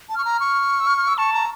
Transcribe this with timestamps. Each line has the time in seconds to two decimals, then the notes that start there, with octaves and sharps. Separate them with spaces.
0.09 A5
0.15 C#6 F6
0.25 A#5
0.40 C#6
0.80 E6
0.87 F6
0.98 F6
1.08 E6
1.18 A5 C#6
1.33 A#5